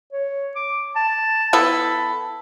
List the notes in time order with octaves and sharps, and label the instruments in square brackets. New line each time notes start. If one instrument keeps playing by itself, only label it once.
[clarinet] C#5
D6
A5
[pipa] B3 E4 A4 [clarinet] B5